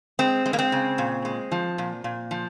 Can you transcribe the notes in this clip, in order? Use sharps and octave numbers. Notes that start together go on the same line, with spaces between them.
G#3 C4
G#3
A#3
C4
C#3
A#2
G#3
F3
A#2
A#2
F3